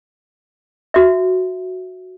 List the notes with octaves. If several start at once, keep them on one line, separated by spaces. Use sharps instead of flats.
F#4 E5